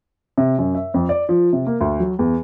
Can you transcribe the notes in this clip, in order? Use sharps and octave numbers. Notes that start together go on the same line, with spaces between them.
C3
F#2
E5
F2
D5
F3
C3
A#3
D2
F#3
E2